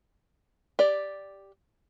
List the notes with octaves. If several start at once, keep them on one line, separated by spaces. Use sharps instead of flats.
G4 D5